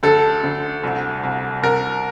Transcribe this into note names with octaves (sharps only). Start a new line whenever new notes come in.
D2 A4
D2
C2
C2
C2 A#4